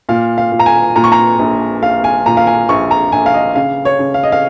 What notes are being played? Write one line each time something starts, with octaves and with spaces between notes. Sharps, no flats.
A#2 F5
F5
A#2
A#5
G#5
A#2 A#5
C#6
A#5
A#1
A#1 F5
G#5
A#2 A#5
F5
G#5
A#1 C#6
A#5
A#1 G#5
F5
D#5
C#3 F5
C#5
C#3
F5
D#5
F5